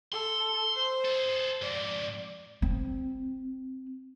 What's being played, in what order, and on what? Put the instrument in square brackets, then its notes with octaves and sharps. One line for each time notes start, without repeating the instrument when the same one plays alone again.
[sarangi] A4 [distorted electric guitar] C6
[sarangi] C5
[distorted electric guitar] G#4 A4
[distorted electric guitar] F2 G#2 [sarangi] D5
[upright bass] C4